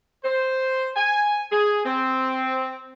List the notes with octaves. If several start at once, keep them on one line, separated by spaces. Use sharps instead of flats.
C5
G#5
G#4
C4